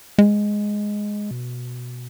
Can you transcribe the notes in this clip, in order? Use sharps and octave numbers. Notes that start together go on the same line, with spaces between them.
G#3
B2